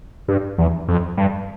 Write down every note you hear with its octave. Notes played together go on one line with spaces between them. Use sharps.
G2
E2
F2
G2